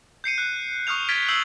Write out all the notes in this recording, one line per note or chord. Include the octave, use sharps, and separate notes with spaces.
G6 C7 C#7 D#7
F#6 C#7
C#6 D#6 F6 G6 F7
F6 G#6 A6 B6 D7 G7
E6 G6 C7 F#7